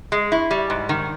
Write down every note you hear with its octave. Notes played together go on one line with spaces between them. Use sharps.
G#3
E4
G3
G#2
D#3